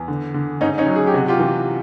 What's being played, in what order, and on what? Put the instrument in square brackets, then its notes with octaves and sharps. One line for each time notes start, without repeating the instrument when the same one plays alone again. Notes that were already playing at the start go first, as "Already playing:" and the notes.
Already playing: [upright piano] E2
D3
D3
G#2 C#4 D#4
C#4 D#4
F#3
G#4
G4
C3 F#4
F4 G4
E3